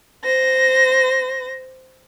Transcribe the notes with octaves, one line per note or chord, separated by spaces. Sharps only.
C5 A#6